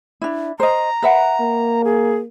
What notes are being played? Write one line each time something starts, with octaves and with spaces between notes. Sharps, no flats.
D4 E4
C5 D#5 A#5
B4 E5 F#5
A#3
G#4